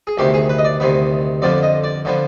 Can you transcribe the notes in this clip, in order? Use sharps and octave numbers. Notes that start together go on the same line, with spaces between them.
G#4
D2 C3 D#3 B3 G4
G#4
B4
D#5
D5
D2 C3 D#3 B3
F2 D3 F3 B3 D5
D#5
D5
D3 F3 B3